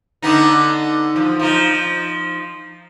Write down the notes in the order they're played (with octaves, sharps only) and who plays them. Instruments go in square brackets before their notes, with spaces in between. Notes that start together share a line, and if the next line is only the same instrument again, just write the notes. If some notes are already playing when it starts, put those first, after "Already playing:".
[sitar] D3 B3 D#4
F3
F3 D#4